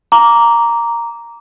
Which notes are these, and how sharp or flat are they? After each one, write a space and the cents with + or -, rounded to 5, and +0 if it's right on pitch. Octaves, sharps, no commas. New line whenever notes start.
A#5 +0 D6 -15